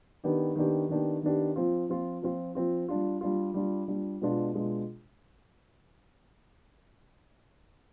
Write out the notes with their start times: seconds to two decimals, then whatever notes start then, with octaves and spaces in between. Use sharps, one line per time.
0.24 D#3 B3 D4 G4
0.56 D#3 B3 D4 G4
0.89 D#3 B3 D4 G4
1.23 D#3 B3 D4 G4
1.56 F3 C4 F4
1.89 F3 C4 F4
2.22 F3 C4 F4
2.55 F3 C4 F4
2.89 G3 D4 F4
3.21 G3 D4 F4
3.54 G3 D4 F4
3.88 G3 D4 F4
4.22 B2 G#3 D4 F4
4.54 B2 G#3 D4 F4